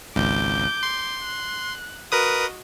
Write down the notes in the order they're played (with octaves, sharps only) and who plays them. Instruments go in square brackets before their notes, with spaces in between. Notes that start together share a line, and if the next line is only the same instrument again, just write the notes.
[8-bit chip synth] G#1 C#2 [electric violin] D6 G6
[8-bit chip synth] C6
[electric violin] F#6
[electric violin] F#4 D#5 [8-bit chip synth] A#4 B4 D#6